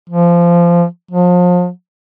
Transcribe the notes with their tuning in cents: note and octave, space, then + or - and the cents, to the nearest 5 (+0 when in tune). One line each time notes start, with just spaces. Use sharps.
F3 -20
F3 +35